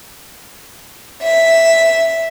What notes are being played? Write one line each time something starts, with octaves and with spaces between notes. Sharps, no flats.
E5